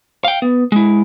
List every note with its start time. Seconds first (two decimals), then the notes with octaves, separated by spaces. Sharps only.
0.24 F5 G5
0.42 B3
0.72 G#3 E4